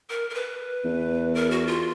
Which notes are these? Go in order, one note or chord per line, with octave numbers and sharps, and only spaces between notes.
A#4
A#4
B4
E2
A#4
F#4
F4